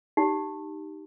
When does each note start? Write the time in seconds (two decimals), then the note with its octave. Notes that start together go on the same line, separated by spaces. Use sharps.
0.17 D#4 G4